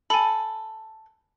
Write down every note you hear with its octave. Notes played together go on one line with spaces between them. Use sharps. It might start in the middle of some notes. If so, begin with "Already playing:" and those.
A4 G#5 B5